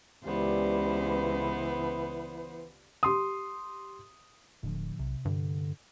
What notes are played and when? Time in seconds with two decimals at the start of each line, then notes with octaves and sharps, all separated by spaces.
0.24 C#2 E3 B3 F4 G4 C5 D5
3.03 G4 C6 D#6
4.63 D1 A2 D3 F3
4.99 B1 C3
5.25 G2 D3